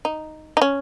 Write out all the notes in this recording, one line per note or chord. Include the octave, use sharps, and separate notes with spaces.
D#4
D#4
C#4